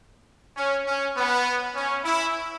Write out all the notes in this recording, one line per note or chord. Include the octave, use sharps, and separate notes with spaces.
C#4
C#4
B3
C#4
E4